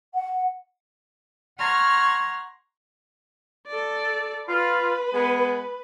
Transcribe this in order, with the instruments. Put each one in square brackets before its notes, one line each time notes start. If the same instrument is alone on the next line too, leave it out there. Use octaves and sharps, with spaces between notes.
[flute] F#5
[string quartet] F#5 A#5 C6 C#6 F6 G#6
[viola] A4 D5
[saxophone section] F4 [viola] B4
[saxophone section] G#3 B3